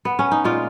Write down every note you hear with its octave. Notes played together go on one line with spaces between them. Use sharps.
B3
C#4
D#4
A#2 G#3 F4